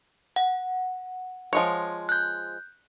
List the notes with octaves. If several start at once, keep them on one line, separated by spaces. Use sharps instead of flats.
F#5
F3 G#3 C#5
F#6 G6